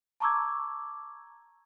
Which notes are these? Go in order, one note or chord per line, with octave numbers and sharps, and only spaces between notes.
A5 A#5 C#6 D6 E6 G#6